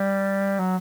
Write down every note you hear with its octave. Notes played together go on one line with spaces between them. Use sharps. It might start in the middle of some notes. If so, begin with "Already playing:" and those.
Already playing: G3
F#3